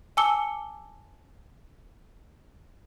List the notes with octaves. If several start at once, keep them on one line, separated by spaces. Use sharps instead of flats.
G#5 A5 D6 E6 C#7 G7